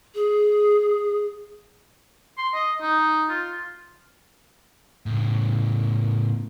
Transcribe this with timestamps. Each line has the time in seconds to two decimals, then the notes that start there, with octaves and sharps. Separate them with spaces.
0.15 G#4
2.38 C6
2.54 D#5
2.82 D#4
3.30 F4
5.06 A2 C#3